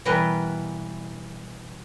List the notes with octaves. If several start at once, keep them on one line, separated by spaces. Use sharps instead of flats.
B2 E3 G3 A#4 B4